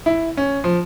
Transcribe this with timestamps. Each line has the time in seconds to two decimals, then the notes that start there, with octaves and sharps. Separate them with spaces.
0.06 E4
0.37 C#4
0.64 F3